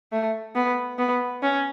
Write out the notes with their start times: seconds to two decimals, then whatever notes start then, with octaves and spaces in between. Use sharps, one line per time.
0.12 A3
0.55 B3
0.98 B3
1.42 C#4